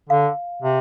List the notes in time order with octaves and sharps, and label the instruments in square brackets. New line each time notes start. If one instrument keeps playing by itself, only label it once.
[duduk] D3 [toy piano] F5
[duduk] C3